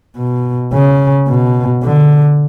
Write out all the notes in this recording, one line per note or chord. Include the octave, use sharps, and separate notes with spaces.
B2
C#3
B2
D3